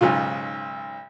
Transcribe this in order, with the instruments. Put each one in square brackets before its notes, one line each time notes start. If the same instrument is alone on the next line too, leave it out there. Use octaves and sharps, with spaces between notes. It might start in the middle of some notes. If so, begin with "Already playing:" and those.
[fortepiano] B1 G#2 C#3 F4